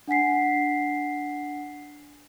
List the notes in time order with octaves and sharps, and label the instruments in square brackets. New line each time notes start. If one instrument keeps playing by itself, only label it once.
[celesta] D4 F#5 G#5 B6 C7